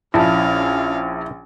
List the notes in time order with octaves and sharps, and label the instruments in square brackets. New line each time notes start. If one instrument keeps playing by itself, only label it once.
[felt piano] A#1 A5 [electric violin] C#4 F5 [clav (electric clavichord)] E4